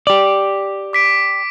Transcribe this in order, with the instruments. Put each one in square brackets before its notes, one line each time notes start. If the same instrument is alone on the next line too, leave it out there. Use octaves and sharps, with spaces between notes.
[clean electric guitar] G4 D5
[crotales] D6 B6 D7